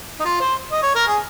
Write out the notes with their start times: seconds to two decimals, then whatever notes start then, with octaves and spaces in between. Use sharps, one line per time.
0.20 D#4
0.25 F4
0.40 C5
0.72 D#5
0.83 C#5
0.95 A#4
1.07 G#4